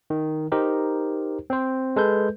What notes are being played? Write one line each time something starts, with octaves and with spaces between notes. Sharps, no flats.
D#3
D#4 G4 A#4 C5
C4 C5
G#3 A4 B4 G6